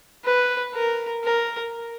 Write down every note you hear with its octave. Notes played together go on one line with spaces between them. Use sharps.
B4
A#4
A#4